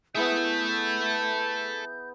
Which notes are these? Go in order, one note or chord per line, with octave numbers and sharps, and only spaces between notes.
B3 E4 G#4 A4 E5 G6